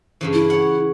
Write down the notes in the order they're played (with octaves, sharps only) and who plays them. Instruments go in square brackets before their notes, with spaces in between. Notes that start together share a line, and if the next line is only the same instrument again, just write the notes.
[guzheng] G2 C#3 E3
[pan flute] E4
[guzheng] C#5 F#5